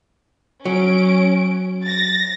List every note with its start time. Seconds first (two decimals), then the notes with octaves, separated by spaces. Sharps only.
0.65 F#3 C#4 D7
1.84 A6 A#6